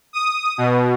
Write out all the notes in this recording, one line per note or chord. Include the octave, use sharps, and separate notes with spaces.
D#6
B2